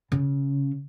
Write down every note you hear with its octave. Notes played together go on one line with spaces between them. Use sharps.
C#3